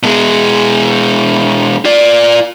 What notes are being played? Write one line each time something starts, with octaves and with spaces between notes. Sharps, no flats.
B2 G#3
F4 D5